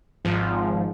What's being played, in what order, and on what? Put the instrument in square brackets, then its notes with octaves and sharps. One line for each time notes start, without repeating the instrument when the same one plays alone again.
[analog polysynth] G#1 G#2 F3